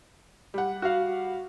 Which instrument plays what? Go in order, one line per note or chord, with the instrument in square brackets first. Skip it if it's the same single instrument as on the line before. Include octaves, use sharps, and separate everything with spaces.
[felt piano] G3 F#5
[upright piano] F#4 F5